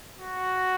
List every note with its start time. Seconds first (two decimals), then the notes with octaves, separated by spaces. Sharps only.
0.18 F#4